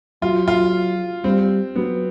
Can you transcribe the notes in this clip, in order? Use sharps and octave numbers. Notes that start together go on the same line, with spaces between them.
F#3 F4
F4
G3 C4
F#3 B3